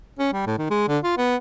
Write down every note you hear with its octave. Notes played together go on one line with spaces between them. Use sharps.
C#4
G3
A2
D#3
G#3
D3
F4
B3